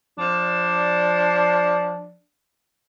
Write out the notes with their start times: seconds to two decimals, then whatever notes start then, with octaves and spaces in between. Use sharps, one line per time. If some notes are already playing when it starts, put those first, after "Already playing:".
0.18 F3 D4